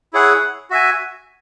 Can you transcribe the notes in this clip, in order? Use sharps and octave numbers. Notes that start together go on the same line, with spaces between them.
E4 G#4 C#5 F#5
F#4 E5 G#5